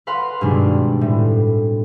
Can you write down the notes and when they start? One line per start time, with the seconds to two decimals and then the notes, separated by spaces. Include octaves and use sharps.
0.07 A#4 B4 F5 F#5 C6
0.41 G2 B2 D#3 G#3 C4 D4
1.01 A2